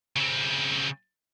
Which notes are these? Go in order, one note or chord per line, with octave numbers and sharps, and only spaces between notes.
C#3 C4